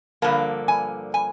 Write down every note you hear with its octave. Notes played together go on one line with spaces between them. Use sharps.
G2 D3 F3 A#3 A5
G#5
G#5